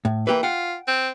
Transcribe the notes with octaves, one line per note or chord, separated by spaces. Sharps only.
A2
E3 A#3 G4 B4
F4 F#5 G5
C4